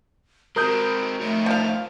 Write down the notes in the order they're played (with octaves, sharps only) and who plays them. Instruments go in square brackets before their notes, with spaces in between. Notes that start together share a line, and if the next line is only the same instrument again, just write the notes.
[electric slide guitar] G#3 C4 [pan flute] F#4 [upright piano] A#4 D#6 G6
[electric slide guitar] F2 D#4 C#5 [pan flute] A3
[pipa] F3 F5